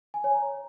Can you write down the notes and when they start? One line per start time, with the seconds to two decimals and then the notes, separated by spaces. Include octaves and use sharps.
0.14 G#5
0.24 C#5
0.34 A#5